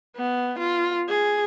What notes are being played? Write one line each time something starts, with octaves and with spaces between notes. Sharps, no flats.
B3
F4
G#4